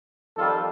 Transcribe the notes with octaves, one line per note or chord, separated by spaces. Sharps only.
F2 D#3 G3 F4 A4